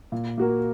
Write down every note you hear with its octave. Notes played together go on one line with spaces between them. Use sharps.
A#2
A#3 F#4 A#4